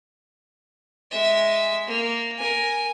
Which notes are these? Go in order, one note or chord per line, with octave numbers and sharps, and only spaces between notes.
G#3 E5
A#3
A#4 G#5